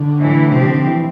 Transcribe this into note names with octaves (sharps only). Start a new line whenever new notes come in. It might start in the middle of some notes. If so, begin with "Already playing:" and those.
Already playing: D3
A2 E3 A3 E4
C3 F3 C4 G4
D3
D3
E3